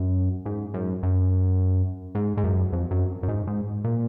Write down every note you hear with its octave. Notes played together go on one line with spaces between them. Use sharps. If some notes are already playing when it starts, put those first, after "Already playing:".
Already playing: F#2
G#2
F#2
F#2
G#2
G#2
F#2
F2
F#2
F#2
G#2
G#2
A#2